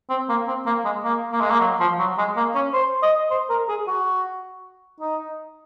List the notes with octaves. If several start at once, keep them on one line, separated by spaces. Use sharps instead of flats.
C4
A#3
C4
A#3
G#3
A#3
A#3
G#3
A#3
F#3
F3
F#3
G#3
A#3
C#4
C5
D#5
C5
A#4
G#4
F#4
D#4